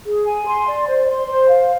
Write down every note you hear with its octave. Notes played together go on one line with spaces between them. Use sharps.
G#4
G#5
C6
D5
C5
C6
C5
F5